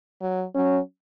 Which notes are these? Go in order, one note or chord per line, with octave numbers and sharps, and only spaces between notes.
F#3
F#3 C#4